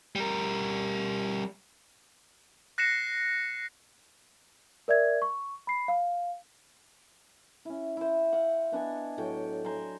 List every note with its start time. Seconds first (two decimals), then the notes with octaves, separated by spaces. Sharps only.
0.16 G3 A#4
2.78 F#6 A#6 C7 C#7 E7
4.88 A#4 D5 E5 G#6
5.22 C#6
5.67 B5 C7
5.88 F5
7.65 C#4 E4
7.97 E4 C5
8.33 F5 F#5
8.72 B3 D4 D#5 G#5
9.18 A2 F#3 A3 G5
9.64 C5 G#5 A#5 C6